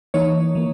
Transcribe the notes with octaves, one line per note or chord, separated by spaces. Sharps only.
E3 A#3 D#4 C#5
E3 A#3